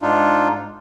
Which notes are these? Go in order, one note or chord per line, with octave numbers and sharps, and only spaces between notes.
G#2 D4 D#4 F4